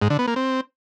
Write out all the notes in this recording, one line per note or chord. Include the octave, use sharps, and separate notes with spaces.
G#2
D3
B3
A#3
C4